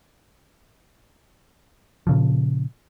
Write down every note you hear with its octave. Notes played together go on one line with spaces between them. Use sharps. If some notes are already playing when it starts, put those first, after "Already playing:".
A#2 C#3 F3